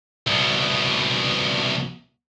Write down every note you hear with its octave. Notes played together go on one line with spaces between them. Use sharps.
C2 B2